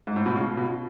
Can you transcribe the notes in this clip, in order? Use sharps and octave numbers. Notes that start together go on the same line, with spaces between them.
G#2
A2
B2
C#3
B2